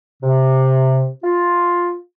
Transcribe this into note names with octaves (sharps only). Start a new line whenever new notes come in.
C3
F4